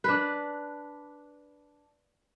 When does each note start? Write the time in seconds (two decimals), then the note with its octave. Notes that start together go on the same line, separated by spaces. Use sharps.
0.04 D4 B4